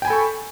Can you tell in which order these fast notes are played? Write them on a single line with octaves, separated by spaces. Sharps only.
G5 G#5 B5 A4 C#6